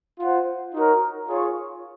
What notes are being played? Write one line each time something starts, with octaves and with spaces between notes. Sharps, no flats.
F4 C5 F#5
D#4 F#4 A#4 C#5
F4 G#4 C#5